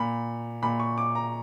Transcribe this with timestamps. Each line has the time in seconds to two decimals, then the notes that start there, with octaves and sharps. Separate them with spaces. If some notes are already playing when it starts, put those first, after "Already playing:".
Already playing: A#2 B5
0.62 A#2 B5
0.80 C#6
0.98 D6
1.15 A#5